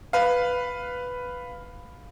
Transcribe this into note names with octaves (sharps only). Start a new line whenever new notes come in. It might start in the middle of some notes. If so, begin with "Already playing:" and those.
B4 F5